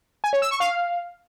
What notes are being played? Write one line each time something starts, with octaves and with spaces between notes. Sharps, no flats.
G#5
C#5
E6
C#6
F5